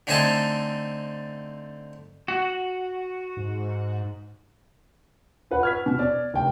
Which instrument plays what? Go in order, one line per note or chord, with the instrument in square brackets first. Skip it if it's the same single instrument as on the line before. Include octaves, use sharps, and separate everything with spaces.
[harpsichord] D3 A3 C4 D#4 G#5 A5
[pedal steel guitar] F#4
[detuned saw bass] G#2
[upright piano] F4 B4 F#5
F6 G#6 B6
B2
D5
F1 G5